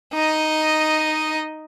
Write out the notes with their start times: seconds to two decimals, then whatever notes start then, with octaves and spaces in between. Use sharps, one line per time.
0.14 D#4 D#5